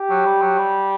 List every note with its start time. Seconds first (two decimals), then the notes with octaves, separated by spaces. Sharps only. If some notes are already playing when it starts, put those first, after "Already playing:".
Already playing: G4
0.10 F#3
0.26 G3
0.42 F#3
0.58 G3